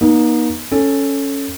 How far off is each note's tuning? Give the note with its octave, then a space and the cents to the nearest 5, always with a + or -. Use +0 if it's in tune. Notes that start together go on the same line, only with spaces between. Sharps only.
A#3 +45 D#4 +0
C#4 +0 A4 +0